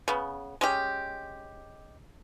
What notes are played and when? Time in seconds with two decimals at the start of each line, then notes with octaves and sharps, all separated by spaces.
0.08 C#3 B3
0.61 G#3 C#4 G4